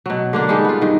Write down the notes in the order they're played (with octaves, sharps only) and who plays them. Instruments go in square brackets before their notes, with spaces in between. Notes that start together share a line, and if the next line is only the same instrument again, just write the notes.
[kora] B2 F#3
D3 A#3 D4
G3 G#3 D#4 A4
B3 F4
G2 D#3